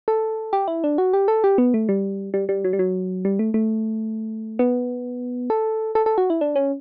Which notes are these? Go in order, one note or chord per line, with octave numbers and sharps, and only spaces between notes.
A4
G4
E4
D4
F#4
G4
A4
G4
B3
A3
G3
G3
G3
F#3
G3
F#3
G3
A3
A3
B3
A4
A4
A4
F#4
E4
D4
C#4